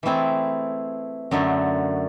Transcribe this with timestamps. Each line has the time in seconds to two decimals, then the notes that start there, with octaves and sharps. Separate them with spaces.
0.03 E3 A3 C4 E4 G#4
1.31 F#2 D3 F#3 A3